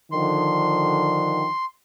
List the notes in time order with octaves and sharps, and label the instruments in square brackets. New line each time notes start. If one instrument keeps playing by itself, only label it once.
[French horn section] D3 D#3 F3 [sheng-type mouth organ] C6